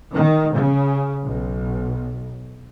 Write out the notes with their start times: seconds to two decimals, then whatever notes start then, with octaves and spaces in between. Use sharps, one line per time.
0.15 D#3
0.54 C#3
1.24 B1